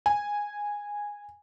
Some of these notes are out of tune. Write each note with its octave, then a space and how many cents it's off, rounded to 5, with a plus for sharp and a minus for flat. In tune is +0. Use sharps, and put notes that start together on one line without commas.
G#5 -10